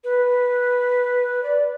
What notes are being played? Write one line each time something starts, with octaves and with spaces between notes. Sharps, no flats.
B4
D5